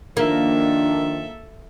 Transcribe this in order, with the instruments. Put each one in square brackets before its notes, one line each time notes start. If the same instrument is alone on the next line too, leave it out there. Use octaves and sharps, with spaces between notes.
[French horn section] D#3 F3 D4 [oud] A#3 [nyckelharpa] A4 E5